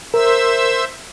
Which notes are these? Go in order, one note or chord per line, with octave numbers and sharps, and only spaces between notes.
A#4 C5 E5 E6